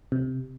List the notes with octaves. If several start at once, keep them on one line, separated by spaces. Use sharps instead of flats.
C3